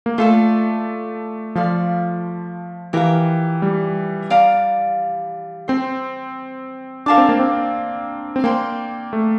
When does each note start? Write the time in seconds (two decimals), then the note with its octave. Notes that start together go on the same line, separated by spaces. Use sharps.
0.06 A#3
0.18 A3 F4 A4 D5
1.55 F3 F4 A4 D5 F5
2.93 E3 G4 A#4 F5 A#5
3.62 G3
4.30 D5 F5 A#5 D6
5.68 C4 C5 G5 C6
7.06 D4 A#4 F5 A5 D6
7.18 C4
7.29 A#3
7.39 C4
8.36 C4
8.44 A#3 D5 G5 C6
9.13 A3